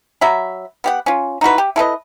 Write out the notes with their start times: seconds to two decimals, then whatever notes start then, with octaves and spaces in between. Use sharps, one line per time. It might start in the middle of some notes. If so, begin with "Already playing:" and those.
0.21 F#3 E5 B5
0.84 B3 G4 F#5
1.06 C#4 F4
1.41 D#4 E4 F#4 B4
1.58 G4
1.76 E4 A4 B4 D#5